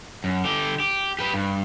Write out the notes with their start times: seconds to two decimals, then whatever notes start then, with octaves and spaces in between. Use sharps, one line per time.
0.24 F#2
0.45 D3 G4
0.80 G4
1.19 G4 B4
1.34 G2